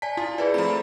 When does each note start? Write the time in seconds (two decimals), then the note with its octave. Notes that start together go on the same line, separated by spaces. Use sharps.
0.02 D5 G#5 A5 B6
0.17 E4 F4
0.38 E4 G#4 B4 D5
0.54 F3 A3 C4 A#5 B5